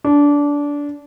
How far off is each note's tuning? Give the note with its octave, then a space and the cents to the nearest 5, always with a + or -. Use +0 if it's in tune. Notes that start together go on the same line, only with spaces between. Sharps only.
D4 -20